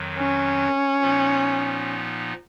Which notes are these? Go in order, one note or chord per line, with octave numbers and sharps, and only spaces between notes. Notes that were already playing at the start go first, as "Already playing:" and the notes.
Already playing: F2 D#3 F#3
C#4
A#2 F3 B3 D#4